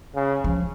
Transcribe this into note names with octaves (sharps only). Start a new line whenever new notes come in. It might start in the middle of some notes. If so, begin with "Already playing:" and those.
C#3
F3